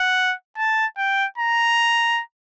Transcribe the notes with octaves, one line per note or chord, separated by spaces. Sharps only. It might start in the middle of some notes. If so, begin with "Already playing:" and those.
Already playing: F#5
A5
G5
A#5